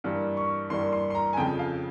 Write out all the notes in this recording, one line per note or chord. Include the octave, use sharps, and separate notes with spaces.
G2 E3 G3 A#3
C#6
G2 E3 G3 A#3 C6
C6
C6
A#5
G#5
F2 C#3 F3 G5
F5